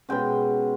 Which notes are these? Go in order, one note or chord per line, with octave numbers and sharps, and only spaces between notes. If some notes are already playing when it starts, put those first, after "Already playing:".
B2 G#3 C#4 G5